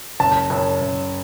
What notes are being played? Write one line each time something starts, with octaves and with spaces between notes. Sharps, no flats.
F#1 A5
F#1
F#1